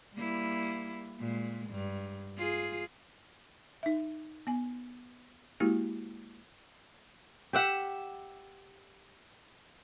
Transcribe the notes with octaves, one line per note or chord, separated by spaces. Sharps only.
G3 A#3 E4
A#2 G#3
G2
F4 G#4
D#4 E5
B3 G#5
G#3 A#3 E4 F#4 G4
G4 E5 F#5